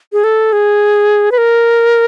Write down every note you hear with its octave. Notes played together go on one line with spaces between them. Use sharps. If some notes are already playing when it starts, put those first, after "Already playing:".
G#4
A4
G#4
B4
A#4